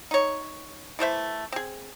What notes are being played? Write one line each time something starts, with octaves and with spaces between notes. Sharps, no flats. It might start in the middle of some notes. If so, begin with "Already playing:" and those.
D#4 C#5
E3 A3 C5 E5
C4 G#4